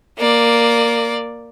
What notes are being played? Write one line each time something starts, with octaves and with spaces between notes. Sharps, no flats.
A#3 D5